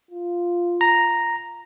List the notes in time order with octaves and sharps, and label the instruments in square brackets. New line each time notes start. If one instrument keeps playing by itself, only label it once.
[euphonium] F4
[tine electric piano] A#5